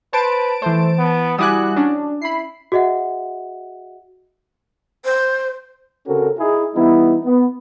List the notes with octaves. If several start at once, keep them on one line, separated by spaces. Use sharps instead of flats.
B4 C5 A5 D7
E3 A3 C5
B3
G3 E4 F#4 G#5 D6 D#6 F#6
C#4 D4
E4 B5 C7
F#4 G#4 D#5 E5 F#5
C5
C#3 C4 C#4 F#4 A4 A#4
D#4 E4 G#4
E3 G3 B3 D#4 E4
B3